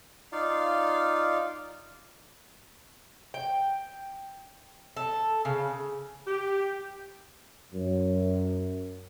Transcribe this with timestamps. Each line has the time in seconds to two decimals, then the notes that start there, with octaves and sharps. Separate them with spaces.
0.32 D#4 F4 D5 F5
3.34 G5
4.97 A4
5.45 C#3
6.27 G4
7.73 F#2